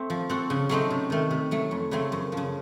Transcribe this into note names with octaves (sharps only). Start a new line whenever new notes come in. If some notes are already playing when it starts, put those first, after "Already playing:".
Already playing: A3 C4
F3
C4 F#4 A4
C#3
F#3 A3 C4 D#4
C3
D#3 A3
C3
F#3 A3
F2
C#3 F#3 A3 C4
F#2
C#3 F3